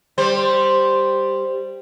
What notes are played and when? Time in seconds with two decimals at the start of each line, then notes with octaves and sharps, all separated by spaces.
0.18 G3 C5